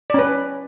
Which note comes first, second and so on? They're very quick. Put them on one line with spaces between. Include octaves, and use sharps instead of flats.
D5 C#4 B4